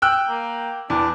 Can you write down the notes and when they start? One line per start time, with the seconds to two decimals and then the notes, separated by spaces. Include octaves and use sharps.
0.02 G5 E6 F#6
0.29 A#3
0.90 E2 D4